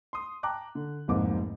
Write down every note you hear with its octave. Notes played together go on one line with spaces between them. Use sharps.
C6 D#6
G5 A5 A#5 D6 F#6
D3
F1 C2 F2 G#2 A#3 D6